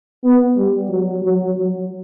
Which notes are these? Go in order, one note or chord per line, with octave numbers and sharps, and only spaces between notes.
B3
G3
F#3
F#3
F#3